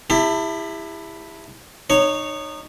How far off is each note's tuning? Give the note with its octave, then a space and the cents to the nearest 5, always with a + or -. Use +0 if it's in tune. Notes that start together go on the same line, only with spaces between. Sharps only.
E4 +0 G4 +40 A5 +30
D#4 -25 C#5 +0